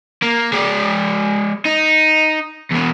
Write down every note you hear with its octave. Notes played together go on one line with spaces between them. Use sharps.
A#3
G#3 D5
D#4
E2 B2